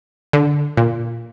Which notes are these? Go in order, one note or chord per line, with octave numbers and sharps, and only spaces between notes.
D3
A#2